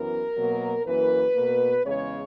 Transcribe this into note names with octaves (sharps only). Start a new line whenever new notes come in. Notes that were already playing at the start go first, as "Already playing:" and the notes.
Already playing: F#2 E3 B3 A#4
B2 F#3 A#3
F#2 E3 A#3 B4
B2 A#3
E2 C#3 G#3 C#5